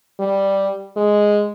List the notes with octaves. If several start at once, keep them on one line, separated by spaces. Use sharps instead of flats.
G3
G#3